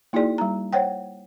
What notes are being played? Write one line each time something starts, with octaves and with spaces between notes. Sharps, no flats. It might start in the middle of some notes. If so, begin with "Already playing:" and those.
A#3 D#4 E4 F#4 G#4 D5
G3 A#5
C5 C#5 F#5 G5